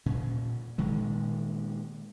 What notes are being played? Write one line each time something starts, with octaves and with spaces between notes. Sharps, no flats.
A#2 C#4
A#2 D#3 G#3